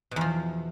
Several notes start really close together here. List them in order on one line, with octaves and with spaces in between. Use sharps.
B2 E2 F3